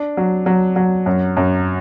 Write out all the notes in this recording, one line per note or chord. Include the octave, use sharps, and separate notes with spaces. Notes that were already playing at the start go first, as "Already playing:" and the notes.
Already playing: D4
F#3
F#3
F#3
F#2
F#2